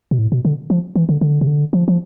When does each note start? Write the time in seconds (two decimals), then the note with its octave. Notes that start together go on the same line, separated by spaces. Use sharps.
0.11 B2
0.19 A2
0.32 B2
0.45 D3
0.70 F3
0.96 E3
1.09 D3
1.21 D3
1.41 C3
1.47 D3
1.73 F3
1.88 F3